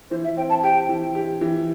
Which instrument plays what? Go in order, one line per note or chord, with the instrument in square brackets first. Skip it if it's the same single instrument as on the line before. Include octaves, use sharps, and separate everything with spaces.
[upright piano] E3 [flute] C5
[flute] E5
[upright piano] C4 [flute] G5
[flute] A5
[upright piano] G4 [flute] G5
[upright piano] E3
G4
E3